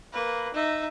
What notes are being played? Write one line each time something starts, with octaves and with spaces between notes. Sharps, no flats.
A#3 B4
D#4 E5